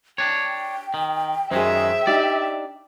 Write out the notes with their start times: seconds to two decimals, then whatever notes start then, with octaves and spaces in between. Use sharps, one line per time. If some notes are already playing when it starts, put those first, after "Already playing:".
0.18 D4 C#5 G5
0.94 D#3
1.51 F#2 D#3 G#3 G#4 C5 E5 G5
2.07 D4 D#4 G4 D5